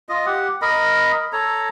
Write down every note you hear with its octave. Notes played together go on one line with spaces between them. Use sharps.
F4 D#5
G4 F#5
A#4 D#5 B5
A4 C#5 A#5